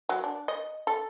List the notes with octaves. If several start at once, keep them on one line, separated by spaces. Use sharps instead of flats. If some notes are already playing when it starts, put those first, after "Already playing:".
F#3
D4
D#5
A4